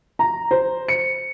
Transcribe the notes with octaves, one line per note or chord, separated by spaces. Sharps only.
A#5
C5
C#7